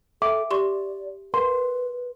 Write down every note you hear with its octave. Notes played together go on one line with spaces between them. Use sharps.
A4 E5 D6
G4 D5 C6 C#6
A#4 B4 C6